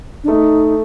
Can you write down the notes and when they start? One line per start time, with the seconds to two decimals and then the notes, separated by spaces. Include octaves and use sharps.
0.24 D4
0.28 A3 D#4